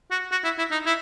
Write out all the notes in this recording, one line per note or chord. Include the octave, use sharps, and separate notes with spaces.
F#4
F#4
E4
E4
D#4
E4